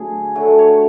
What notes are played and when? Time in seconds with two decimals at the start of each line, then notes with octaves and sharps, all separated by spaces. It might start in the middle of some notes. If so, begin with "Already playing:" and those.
Already playing: D3 F#3 A3 G#4
0.35 D3 F#3 A3
0.59 C#5